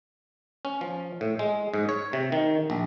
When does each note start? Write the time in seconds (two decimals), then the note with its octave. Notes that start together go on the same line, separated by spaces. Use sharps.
0.65 C#4
0.81 F3
1.21 A2
1.39 G#3
1.74 G#2
1.89 C#5
2.13 C3
2.32 D#3
2.70 A#1